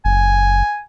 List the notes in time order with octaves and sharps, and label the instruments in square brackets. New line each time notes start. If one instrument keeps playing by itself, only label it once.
[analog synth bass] F#1 [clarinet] G#5